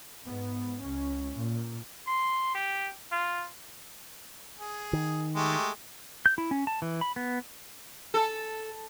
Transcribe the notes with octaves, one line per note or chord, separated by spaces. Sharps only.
G#2 B3
C#2 C#4
A#2
C6
G4
F4
G#4
D#3
G#3 A3 G4
G6
E4
C#4
A5
E3
B5
B3
A4